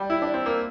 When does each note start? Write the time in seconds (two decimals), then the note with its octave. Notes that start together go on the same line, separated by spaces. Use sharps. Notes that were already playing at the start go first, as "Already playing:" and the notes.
Already playing: G3
0.10 E4
0.22 D4
0.34 C4
0.46 A#3